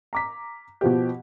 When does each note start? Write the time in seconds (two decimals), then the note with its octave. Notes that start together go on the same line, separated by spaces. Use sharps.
0.13 A#5 D6 B6
0.81 B2 F3 G4